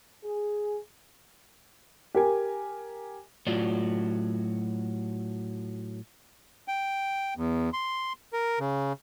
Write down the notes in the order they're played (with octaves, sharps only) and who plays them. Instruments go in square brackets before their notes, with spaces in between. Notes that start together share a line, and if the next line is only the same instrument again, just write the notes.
[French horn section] G#4
[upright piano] G4 A#4 G#5
[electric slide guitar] A2 F#3 F4 D5
[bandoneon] G5
E2
C6
A#4
C#3